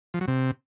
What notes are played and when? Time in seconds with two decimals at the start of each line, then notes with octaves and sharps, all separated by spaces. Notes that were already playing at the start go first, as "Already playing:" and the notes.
0.14 F3
0.21 F#3
0.28 C3